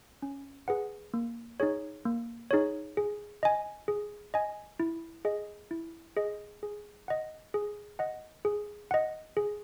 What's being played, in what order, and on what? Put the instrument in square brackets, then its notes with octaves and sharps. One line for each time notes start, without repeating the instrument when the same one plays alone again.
[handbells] C#4
G#4 B4 F#5
A#3
D#4 G#4 C#5
A#3
D#4 G#4 C#5
G#4
D#5 G#5
G#4
D#5 G#5
E4
G#4 D#5
E4
G#4 D#5
G#4
D#5 F#5
G#4
D#5 F#5
G#4
D#5 F#5
G#4